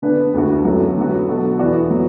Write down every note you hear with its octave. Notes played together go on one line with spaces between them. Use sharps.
D3 B3 D4 B4
D2 D3 A3 F#4
F#2 F#3 A3 F#4 A4
D3 F#3 B3 F#4
B2 B3 F#4 A4
E2 E3 B3 F#4 D5
F#3 B3 F#4